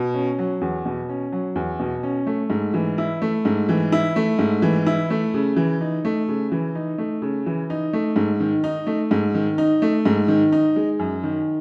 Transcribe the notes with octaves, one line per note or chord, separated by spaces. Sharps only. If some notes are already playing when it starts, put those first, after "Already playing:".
Already playing: B2
C#4
F#3
E2
B2
C#4
F#3
E2
B2
C#4
A3
G#2
E3
E4
A3
G#2
E3
E4
A3
G#2
E3
E4
A3
C#3
E3
D#4
A3
C#3
E3
D#4
A3
C#3
E3
D#4
A3
G#2
D#3
D#4
A3
G#2
D#3
D#4
A3
G#2
D#3
D#4
G#3
F#2
D#3